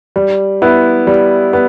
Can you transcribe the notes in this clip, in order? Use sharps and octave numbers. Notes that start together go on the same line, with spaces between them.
G3
B3 E4
G3
B3